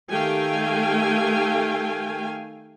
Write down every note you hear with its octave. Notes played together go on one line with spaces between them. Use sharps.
D#3 A3 G4 F5 G5 G#5